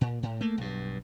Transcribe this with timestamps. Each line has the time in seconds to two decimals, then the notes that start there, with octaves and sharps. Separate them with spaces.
0.01 A#2
0.23 A2
0.41 A3 A#3
0.58 B1 G2